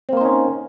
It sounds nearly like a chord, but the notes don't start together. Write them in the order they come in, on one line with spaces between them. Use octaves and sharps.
C4 A#3 C5 D#4 C#4